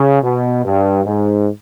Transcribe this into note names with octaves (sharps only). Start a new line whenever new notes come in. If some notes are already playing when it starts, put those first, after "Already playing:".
Already playing: C#3
B2
G2
G#2